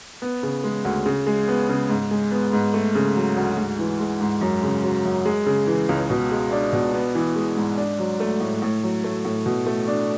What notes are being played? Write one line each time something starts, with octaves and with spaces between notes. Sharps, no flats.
B3
C#3
G#3
D2
C#3
G#3
B3
C#3
G#2
G#3
B3
G#2
A3
C#3
F#3
D2
G#2
E3
G#3
G#2
F#2
C#3
F#3
F#2
G#3
C#3
E3
C#2
B2
G#3
D4
B2
B3
E3
G#3
G#2
D4
F#3
A3
A2
A2
F#3
A3
A2
B2
A3
D4